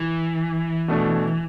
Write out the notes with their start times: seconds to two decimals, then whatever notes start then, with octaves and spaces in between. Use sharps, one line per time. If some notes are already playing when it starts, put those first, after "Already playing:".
Already playing: E3
0.88 B2 A3 D4